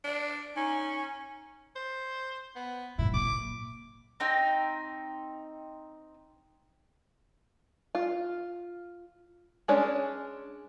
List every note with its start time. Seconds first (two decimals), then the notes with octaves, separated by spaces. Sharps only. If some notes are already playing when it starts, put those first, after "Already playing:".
0.04 D4
0.56 C#4 D#4 G#5
1.76 C5
2.56 B3
2.98 B1 G#2 E4
3.14 A#2 D6
4.20 C4 D#4 G5
7.95 F4
9.68 G#3 C#4 D4 C#5